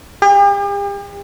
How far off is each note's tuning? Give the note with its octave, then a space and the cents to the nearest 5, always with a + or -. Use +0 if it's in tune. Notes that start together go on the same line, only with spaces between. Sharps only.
G4 +45